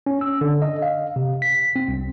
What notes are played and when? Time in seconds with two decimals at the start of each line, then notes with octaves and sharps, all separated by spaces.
0.06 C#4
0.21 E6
0.41 D3
0.62 D#5
0.82 F5
1.16 C3
1.42 B6
1.76 C4
1.88 C2